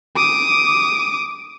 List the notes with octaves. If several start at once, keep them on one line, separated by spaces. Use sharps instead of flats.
D6 D#6